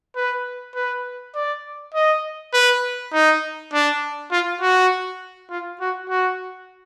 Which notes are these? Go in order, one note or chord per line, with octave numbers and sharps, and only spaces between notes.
B4
B4
D5
D#5
B4
D#4
D4
F4
F#4
F4
F#4
F#4